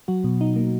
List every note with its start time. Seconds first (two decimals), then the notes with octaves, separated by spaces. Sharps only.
0.08 F#3 F#4
0.24 B2
0.41 D#4
0.56 A#3